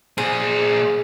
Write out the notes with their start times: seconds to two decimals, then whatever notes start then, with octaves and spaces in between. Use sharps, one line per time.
0.18 A#2 G#4 C5